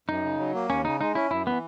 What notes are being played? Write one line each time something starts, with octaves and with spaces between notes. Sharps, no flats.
F#2 D#4
C#3
F#3
A#3
D#2 C#4
C#3 D#4
G#3 D#4
C#4 E4
F#2 E4
E3 B3